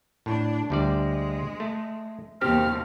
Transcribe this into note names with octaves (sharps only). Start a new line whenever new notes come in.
A2 D4
D2 G3 G#3 D5
A3
D#2 B2 C4 G4 F6